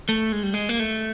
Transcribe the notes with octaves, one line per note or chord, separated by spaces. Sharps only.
A3
G#3
G3
G#3
A#3
A3